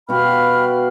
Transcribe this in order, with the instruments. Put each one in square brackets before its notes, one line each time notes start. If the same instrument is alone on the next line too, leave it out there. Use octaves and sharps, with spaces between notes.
[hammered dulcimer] B2 F#4 G4 [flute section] F5 B5 F6